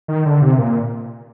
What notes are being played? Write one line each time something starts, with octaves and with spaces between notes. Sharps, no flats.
D#3
D3
C3
A#2